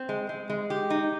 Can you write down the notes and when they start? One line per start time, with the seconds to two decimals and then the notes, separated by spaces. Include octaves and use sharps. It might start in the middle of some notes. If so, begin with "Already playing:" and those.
Already playing: C4
0.09 G#3
0.29 G#3
0.50 G#3
0.70 G4
0.90 D#4